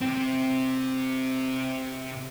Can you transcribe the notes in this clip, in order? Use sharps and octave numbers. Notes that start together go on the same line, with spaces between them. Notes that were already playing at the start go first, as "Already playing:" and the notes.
C3 C4